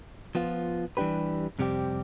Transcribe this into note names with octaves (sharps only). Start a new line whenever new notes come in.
F3 B3 F4
E3 G3 D4 G4 B4
F2 C3 G3 C4 G4